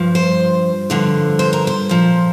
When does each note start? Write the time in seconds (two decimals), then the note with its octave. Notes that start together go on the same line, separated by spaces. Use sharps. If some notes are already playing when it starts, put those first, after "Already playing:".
Already playing: G2 F3
0.15 C5
0.90 G2 D3 F3
1.39 C5
1.53 A#4
1.67 C5
1.89 A#2 F3